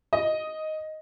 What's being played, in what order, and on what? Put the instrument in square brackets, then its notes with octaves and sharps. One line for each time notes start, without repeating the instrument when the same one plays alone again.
[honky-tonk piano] D#5